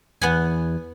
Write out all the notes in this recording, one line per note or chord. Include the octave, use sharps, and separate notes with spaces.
E2 B3 F#5 G#5